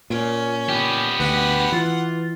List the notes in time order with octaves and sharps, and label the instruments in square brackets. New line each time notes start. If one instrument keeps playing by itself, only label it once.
[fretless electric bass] A#2 [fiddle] C#4
[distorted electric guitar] B3 G4
[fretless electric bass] D2 [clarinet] B4 [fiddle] F#5
[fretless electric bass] E3 [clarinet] F4